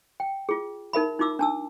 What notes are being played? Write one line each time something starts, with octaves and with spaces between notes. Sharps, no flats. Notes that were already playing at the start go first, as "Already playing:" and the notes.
G5
F4 G#4
D#4 A#4 E5 B5
D#4 F4 D6 E6
D4 A5 E6